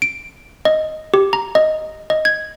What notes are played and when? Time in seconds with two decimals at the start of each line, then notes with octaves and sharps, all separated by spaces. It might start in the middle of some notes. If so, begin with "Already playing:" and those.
0.02 D7
0.65 D#5
1.14 G4
1.33 A#5
1.55 D#5
2.10 D#5
2.25 G#6